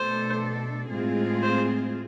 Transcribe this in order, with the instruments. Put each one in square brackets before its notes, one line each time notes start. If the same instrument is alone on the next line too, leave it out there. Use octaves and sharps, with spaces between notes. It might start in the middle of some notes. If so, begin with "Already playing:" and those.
Already playing: [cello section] B2 A3 D4 A4 [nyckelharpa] C5
[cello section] A2 G#3 C4 F4 G#4
[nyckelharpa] C5